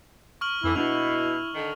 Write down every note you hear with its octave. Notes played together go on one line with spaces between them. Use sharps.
C#6 F6 F#7
F2 D3 E3 E4
B2 A#3 D4 E4 F7
D3 D#3